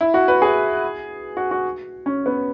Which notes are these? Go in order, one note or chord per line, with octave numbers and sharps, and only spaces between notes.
E4
F#4
B4
G#4
F#4
F#4
C#4
B3